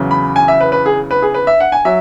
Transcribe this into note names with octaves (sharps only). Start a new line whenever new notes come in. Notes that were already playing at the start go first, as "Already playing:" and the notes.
Already playing: E2 C#3 F#3
B5
G#5
E5
B4
B4
G#4
B4
G#4
B4
E5
F#5
G#5
F#3 E5